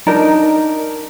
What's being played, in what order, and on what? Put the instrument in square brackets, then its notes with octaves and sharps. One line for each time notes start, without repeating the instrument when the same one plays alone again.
[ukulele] D4 D#4 A#4